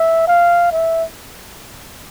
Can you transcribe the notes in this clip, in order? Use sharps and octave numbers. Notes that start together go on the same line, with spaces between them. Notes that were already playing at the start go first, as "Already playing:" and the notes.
Already playing: E5
F5
E5